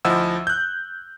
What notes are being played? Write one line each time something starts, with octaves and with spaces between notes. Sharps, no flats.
D2 F3 E4 D#5 F#5 E6
F#6 G6